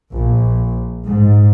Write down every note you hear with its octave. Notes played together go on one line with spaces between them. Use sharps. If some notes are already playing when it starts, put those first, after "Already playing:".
A#1
G#2